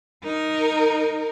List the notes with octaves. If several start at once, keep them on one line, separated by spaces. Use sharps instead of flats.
D#4 A#4